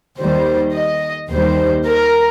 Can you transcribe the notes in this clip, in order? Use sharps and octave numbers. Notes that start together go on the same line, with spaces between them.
D#2 D#3 G3 C5
D#5
D#2 D#3 G3 C5
A#4